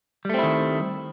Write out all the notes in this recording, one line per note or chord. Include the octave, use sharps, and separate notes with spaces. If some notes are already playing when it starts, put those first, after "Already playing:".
D#3 G3 A3 C4 E4